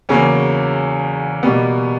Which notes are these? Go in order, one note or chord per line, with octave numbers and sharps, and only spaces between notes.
E2 C#3 F#3 A#3 C#4
B2 G3 A#3 B3